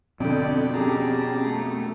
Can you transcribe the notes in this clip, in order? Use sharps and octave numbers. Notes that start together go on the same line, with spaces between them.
F2 B2 D3 D5 G5
F2 C#4 G4 G#4 A5 A#5
A3